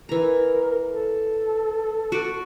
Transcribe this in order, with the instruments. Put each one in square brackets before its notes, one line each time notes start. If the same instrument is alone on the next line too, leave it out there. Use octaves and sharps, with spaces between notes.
[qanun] E3 A#5 [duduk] A#4
[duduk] A4
[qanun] F#4 D5